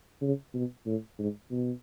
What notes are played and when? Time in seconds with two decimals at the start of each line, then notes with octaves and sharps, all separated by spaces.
0.22 C#3
0.54 B2
0.86 A2
1.19 G#2
1.51 B2